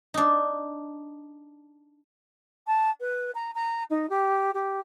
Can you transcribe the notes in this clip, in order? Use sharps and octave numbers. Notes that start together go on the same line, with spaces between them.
D4 D#4
A5
B4
A#5
A#5
D#4
G4
G4